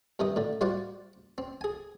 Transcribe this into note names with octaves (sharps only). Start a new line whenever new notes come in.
G2 C3 D#3 D#6
A2 D3
G3 F4 F#4 C5 D5 F#5
C4
G#4 G#5